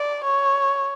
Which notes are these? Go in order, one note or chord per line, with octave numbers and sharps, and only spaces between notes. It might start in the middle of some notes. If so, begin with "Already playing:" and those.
Already playing: D5
C#5